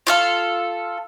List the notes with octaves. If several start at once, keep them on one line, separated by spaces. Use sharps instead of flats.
F4 A4 F5